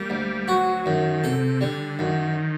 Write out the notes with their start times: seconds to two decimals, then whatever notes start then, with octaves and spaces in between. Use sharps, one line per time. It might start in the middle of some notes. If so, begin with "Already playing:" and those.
Already playing: G3 A#3
0.10 D2
0.48 F#3 F#4
0.86 F#2 D#3
1.24 C3 A4
1.61 D3 G3
1.99 F#2 D#3